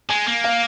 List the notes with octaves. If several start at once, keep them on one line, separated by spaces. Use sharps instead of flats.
G#3 G#5
A#3
F5